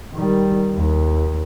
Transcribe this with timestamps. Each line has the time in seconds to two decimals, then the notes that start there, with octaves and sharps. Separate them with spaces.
0.14 D#3 G3
0.75 D#2